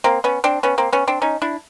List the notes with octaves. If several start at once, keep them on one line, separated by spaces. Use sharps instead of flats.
A#3 C4
B3 C#4
C4 D4
B3 C#4
A#3 C4
B3 C#4
C4 D4
C#4 D#4
D4 E4